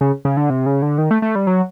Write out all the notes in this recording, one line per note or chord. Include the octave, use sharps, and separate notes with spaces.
C#3
C#3
D3
C3
C#3
D3
D#3
A3
A3
G3
F#3